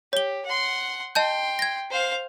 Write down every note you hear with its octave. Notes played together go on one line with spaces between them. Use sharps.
G4 C#5 G7
F#5 C6
D#5 G5 A5 C6 G6
G#6 A#6
C5 F5